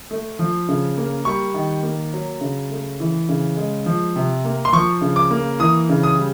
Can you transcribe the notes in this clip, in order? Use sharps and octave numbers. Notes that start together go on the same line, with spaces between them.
A3
F3
C#3
A#3
G3 C#6
D#3
A#3
F#3
C#3
A3
E3
C#3
G#3
F3
C3
A#3
C6
F3 C#6
C#3
D6
A#3
E3 D#6
C#3
D#6
G3